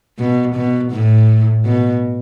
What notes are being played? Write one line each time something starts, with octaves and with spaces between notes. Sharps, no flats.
B2
B2
A2
B2